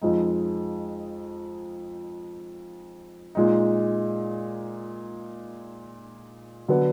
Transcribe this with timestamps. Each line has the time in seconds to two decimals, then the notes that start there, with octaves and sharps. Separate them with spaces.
0.02 F2 F3 G#3 D#4
3.35 A#2 G#3 D#4
6.69 D3 F#3 B3